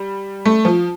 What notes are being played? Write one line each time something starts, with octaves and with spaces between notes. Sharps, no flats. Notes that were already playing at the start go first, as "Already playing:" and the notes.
Already playing: G3
A3
F3